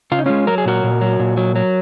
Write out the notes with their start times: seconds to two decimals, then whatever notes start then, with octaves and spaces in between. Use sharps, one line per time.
0.12 C#3 F4
0.19 D#4
0.26 G#3 C#4 F4
0.47 F#3 A#4
0.58 G#4
0.66 A#2 F#4 A#4
0.84 A#2
1.01 F#3
1.20 A#2
1.37 F#3
1.56 F#3